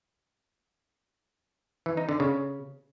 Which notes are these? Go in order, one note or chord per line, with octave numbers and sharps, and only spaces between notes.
E3
D#4
D3
C#3